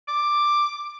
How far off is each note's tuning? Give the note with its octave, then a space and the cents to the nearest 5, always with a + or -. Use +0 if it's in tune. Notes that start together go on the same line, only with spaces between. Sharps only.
D6 +5